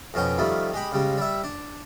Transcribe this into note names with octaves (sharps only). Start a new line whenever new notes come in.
F2 B2 C#4 G5
D#3 F3 G3 A3
G#3 G4 B5
C#3 G3 G#3
G3 E5
D4